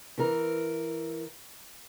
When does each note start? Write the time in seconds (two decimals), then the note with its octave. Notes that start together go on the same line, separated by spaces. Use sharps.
0.18 E3 A#4